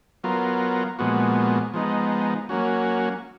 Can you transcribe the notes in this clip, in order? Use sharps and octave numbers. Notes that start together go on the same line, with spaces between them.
F#3 B3 F4 A#4
A#2 F3 G#3 B3 F#4
F3 G#3 B3 D#4
F#3 A#3 C#4 F#4